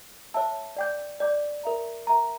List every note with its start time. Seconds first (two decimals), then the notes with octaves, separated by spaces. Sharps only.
0.34 C#5 E5 A5 E6
0.77 D5 G5 D6 G6
1.20 D5 G5 D6 G6
1.63 A#4 E5 A#5
2.07 A#4 E5 A#5